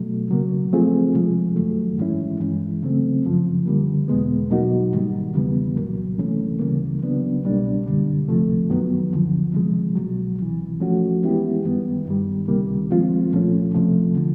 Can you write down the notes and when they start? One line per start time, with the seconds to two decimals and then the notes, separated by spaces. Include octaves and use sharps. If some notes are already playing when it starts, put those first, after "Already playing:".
Already playing: B2 F#3 A3
0.31 C#3 F#3 A#3
0.72 F3 A3 C4 F4 G#4
1.14 C3 F3 G#3
1.56 F#2 D#3 F#3 A3
1.98 G#2 E3 G#3 C#4 E4
2.40 G2 E3 G#3
2.83 C#3 F#3 A3 C4
3.25 F#2 C#3 F3
3.66 D3 G3 A#3
4.08 E2 B2 G#3 B3
4.50 B2 F#3 A#3 D#4 F#4
4.93 G#2 D#3 G3
5.34 E2 C#3 E3 G3 B3
5.77 C2 A#2 F#3 A#3
6.18 C#2 C3 E3 A3 C#4
6.60 D2 C#3 E3 G3 A#3
7.02 C#3 F#3 B3 D4
7.45 C2 B2 G3 A#3 D4
7.86 F#2 D3 G3
8.28 C2 C3 F3 A3
8.70 F#2 D#3 F#3 B3
9.13 D2 D3 F3
9.54 C3 F3 G#3
9.96 C2 B2 F#3
10.39 C2 C3 E3
10.80 F3 A3 C#4 F#4
11.23 E3 G#3 B3 E4 G4
11.65 F#2 D#3 G3 B3
12.06 G2 D#3 G3
12.48 C#2 C3 D#3 G3 A#3
12.90 F3 G#3 C4 F4
13.32 C2 A#2 F3 A3 C#4
13.74 C#2 C3 F3 A3
14.16 D3 F3